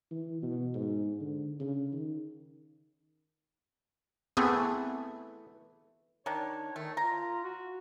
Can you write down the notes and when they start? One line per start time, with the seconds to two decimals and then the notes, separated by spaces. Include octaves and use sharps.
0.11 E3
0.42 B2
0.74 G#2
1.21 D3
1.60 C#3
1.93 D#3
4.37 E3 A3 B3 C4 G#4
6.26 D#3 D4 C#5
6.76 D#3 A3
6.97 F4 A#5
7.44 F#4